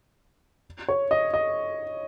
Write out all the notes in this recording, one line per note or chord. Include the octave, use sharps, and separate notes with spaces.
C#5
D#5
D#5